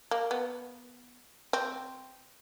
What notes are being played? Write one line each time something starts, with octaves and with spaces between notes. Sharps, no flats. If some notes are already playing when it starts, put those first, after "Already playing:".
A#3
B3
C4